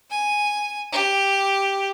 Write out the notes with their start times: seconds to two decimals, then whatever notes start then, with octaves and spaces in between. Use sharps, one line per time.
0.11 G#5
0.93 G4